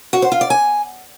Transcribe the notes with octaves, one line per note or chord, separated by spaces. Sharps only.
F#4
C5
F4
D5
G#5